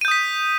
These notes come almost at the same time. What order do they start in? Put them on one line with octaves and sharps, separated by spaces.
D#7 G6 D#6 B6